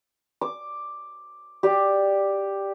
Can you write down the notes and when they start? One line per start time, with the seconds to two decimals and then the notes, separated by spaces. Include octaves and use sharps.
0.41 D6
1.63 G4 D5 G5